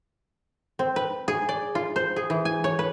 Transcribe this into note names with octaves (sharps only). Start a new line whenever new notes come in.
C4
B4
G#4
D5
F4
C5
G#4
E3
G#5
C#5
B4